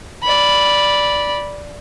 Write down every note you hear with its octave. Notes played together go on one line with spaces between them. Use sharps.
D5 B5